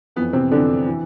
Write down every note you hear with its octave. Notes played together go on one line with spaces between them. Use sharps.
F2 E3 B3
C3 C4
F2 D3 E3 D4
E3